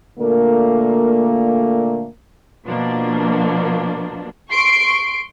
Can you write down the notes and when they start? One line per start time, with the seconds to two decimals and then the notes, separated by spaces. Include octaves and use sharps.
0.19 A#2 D3 A3 A#3
2.66 B2 F3 A#3 D4
4.50 C6 C#6 C7 D7